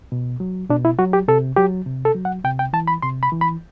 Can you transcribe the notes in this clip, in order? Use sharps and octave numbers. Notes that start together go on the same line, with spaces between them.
B2
F#3
B2 D4
E4
F#3 F#4
G4
C3 A4
F#3 G4
C3
A4
F#3
F#5
C3 G5
G5
E3 A5
B5
C3 C6
B5
E3
B5